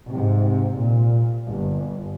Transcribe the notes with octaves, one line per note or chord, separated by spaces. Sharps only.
G#2 C3
A#2
G1